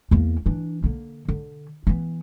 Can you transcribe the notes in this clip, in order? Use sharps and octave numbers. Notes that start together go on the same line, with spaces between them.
E2 A#3
E3 D4
D3 A#3
D3
E3 B3